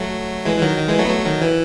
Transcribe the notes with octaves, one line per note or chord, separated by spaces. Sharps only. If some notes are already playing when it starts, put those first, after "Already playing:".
Already playing: F#3 A3
E3 G#3
E3
D#3 F#3
D#3
E3 G#3
F#3 A3
B3
F#3 A3
D#3 F#3
E3